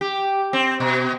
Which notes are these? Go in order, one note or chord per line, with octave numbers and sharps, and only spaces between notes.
G4
C4
B2